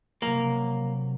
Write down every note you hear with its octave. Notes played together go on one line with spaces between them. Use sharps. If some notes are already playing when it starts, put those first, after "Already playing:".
C3 F#3 A#3